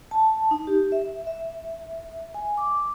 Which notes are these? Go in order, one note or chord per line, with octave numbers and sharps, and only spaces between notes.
A5
D#4
G4
E5
E5
G#5
D6